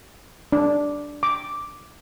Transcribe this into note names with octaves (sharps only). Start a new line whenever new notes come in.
D4
D6